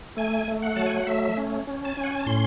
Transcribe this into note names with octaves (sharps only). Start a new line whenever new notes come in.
A3 G#5
A3
F#5
F#3 A5
G#5
F#5
A3 E5
C#4
C#4
A5
C#4 G#5
F#5
G#5
A5
A2 C6